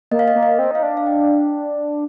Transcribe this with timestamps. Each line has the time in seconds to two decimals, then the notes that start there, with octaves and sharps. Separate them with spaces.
0.11 A#3 D#5
0.19 F5
0.28 D#5
0.35 A#3
0.43 D#5
0.59 C4
0.71 D#4 F5
0.83 D4
0.97 F5
1.07 G5